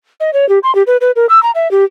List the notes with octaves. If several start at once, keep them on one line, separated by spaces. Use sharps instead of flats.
D#5
C#5
G4
C6
G4
B4
B4
A#4
E6
A#5
E5
G4